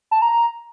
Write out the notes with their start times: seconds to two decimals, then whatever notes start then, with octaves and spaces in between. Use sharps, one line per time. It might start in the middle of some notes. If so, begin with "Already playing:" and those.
0.11 A5
0.22 A#5
0.32 A#5